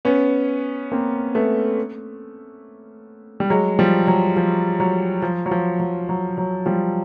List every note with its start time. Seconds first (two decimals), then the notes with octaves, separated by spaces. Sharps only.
0.05 B3 C#4
0.92 A#3 C4
1.35 A3 B3
3.40 G3
3.50 F#3 G#3
3.79 F3 G3
4.07 F#3
4.37 F3
4.80 F#3
5.22 F3
5.46 F#3
5.51 F3
5.80 F#3
6.09 F#3
6.38 F#3
6.66 F3 G3